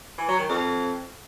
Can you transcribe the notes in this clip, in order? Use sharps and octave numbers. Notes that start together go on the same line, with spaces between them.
E3
F#3
D#3
F2